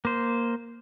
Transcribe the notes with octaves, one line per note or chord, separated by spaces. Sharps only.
A#3 C5